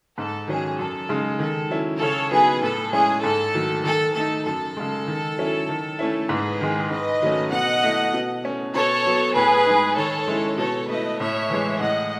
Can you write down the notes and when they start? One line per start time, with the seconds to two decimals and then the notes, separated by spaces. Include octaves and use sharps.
0.18 G#2 A4
0.48 D#3 F#3 C#4 G#4
0.78 F#2 A4
1.09 C#3 G#3 D#4
1.39 D#3 A4
1.70 F#3 C#4 E4
2.01 C#3 A4 C#5
2.31 F#3 B3 D#4 G#4 B4
2.62 A2 A4
2.93 G#3 C#4 E4 G#4
3.24 G#2 A4
3.54 D#3 F#3 A3
3.84 D#3 A4
4.15 A3 D#4 A4
4.46 F#2 A4
4.77 C#3 G#3
5.07 D#3
5.38 F#3 C#4 E4
5.69 D#3
5.99 A3 C#4 E4
6.29 G#2 G#4 B4
6.61 D#3 G#3
6.90 G#2 B4 D#5
7.22 D#3 F#3 A3 C#4
7.52 B2 D#5 F#5
7.83 A3 E4
8.13 B2
8.43 A3 C#4
8.74 B2 A4 C#5
9.06 F#3 B3
9.35 A2 G#4 B4
9.66 G#3 D#4
9.97 D#3 A4 C#5
10.28 G#3 C#4 E4
10.58 B2 A4 C#5
10.88 A3 E4 B4 D#5
11.20 A2 C#5 E5
11.50 E3 G#3
11.80 A2 D#5 F#5